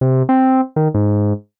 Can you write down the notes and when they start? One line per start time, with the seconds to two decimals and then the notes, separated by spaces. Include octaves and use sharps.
0.01 C3
0.29 C4
0.76 D#3
0.94 G#2